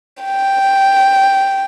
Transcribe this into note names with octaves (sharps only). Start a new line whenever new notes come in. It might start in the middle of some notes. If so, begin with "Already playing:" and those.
G5